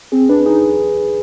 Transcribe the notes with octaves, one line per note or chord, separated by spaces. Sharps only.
C4 G#4
D4 B4
D#4 G#4